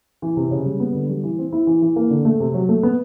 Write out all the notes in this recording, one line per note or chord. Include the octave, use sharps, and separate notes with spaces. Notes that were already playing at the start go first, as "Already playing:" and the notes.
E3
C3
C#3
G3
B3
D3
G3
E3
C4
E4
E3
E3
A#3
D3
A3
C3
F#3
A3
B3